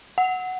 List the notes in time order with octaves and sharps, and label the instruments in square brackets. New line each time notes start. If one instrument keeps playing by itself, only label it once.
[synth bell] F#5